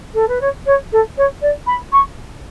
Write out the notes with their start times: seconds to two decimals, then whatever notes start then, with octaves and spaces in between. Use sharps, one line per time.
0.15 A4
0.29 B4
0.41 C#5
0.66 C#5
0.93 A4
1.18 C#5
1.42 D5
1.67 B5
1.93 C#6